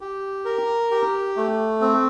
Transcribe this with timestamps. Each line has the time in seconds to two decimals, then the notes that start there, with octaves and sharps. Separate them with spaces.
0.01 G4
0.45 A#4
0.91 G4
1.36 A3
1.81 C4